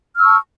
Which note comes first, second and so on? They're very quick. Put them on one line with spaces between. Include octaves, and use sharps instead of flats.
F6 E6 C#6 A5